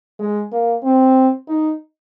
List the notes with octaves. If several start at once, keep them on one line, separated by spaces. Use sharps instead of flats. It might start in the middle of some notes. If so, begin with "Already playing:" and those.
G#3
A#3
C4
D#4